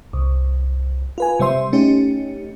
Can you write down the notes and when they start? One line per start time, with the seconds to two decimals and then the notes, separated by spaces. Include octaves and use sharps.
0.13 C2
1.18 F4 B4 G#5
1.39 C3 G3 C5 E5 C6
1.73 A3 C#4 D#4 G4